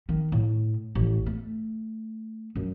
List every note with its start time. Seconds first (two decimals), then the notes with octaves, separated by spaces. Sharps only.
0.09 D#3
0.32 A2
0.95 A1
1.26 A3
2.55 F#2